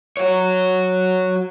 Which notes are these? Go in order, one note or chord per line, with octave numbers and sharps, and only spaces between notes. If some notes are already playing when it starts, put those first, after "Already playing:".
F#4 C#5